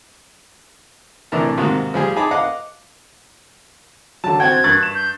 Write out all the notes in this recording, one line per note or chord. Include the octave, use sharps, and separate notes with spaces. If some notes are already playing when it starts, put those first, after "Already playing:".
C2 A2 E3 D4 A#4 A5
G#2 C3 D#3 A#3 F#4
F3 G3 G#4
D#4 G#4 A5 B5 D6
D#5 F5 F#5 D6
D3 F#3 A5
C4 F#4 F#5 G5 G#6 A6
G2 C#6 F#6 A6
E7
G6